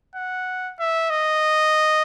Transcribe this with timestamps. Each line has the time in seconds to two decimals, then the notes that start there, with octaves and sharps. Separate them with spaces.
0.15 F#5
0.79 E5
1.10 D#5